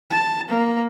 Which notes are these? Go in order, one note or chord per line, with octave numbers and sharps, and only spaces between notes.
A5
A#3